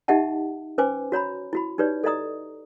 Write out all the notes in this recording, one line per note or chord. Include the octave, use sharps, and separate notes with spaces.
D#4 G4 D#5 E5 F#5 A5
C#4 B4 C5 G#5 D6
F#4 C#5 A#5 B5
E4 F#4 B5
D#4 G4 B4 C#5 D5
A4 D5 D#5 A#5 D#6